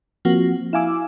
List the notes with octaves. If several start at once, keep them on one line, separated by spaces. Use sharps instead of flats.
F3 A#3 C4 F#4
E4 F5 G#5 D6 E6